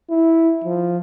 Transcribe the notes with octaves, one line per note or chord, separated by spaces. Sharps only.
E4
F3